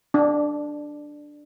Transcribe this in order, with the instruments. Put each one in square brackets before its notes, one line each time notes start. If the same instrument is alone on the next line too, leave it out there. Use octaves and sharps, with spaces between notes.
[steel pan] D4